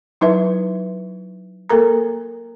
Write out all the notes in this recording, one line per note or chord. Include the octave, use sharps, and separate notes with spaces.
F#3 D#4 E4 B4 E5
A#3 A4 A#4 A#5